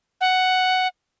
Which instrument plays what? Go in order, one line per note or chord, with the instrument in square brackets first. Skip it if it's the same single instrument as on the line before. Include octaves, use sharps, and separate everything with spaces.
[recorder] F#5